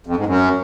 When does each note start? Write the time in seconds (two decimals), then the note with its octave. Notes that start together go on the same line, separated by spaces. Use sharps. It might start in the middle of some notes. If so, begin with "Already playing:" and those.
0.07 F2
0.16 G#2
0.26 F#2